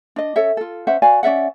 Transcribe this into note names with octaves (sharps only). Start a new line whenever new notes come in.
D4 D#5
C#4 A4 C#5 E5
F4 A4
C#4 C5 E5 F#5
F#4 D5 F5 G#5
C#4 D5 E5 F#5